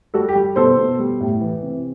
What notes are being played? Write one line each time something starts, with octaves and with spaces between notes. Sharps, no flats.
G3 F#4 A4
G4
G3
B2 A4 C5
B2
G3
A2
E3
C3